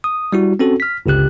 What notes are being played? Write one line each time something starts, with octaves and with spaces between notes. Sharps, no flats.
D#6
G3 E4 F#4
C4 C#4 F#4 A4
F6 B6
G1 C#2 C#3 G4 F#6